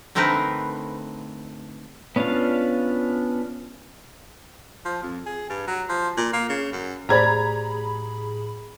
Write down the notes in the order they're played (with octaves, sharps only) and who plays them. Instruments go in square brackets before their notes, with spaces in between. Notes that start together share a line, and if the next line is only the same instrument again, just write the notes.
[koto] D3 A3 C4 D#4 A#4 B4
[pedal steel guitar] B3 C#4 D4 F4 F5
[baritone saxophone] F3
F2
G#4
G2
F#3
F3
A#2
A#3
C#3
F#2
[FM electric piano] A2 G#4 B5 [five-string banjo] G4 C5 D5 [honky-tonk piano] A#5 G#6